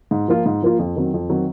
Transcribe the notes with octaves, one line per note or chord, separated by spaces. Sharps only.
G#2
F3 A#3 F4
G#2
F3 A#3 F4
F2
D#3 F#3 C4
F2
D#3 F#3 C4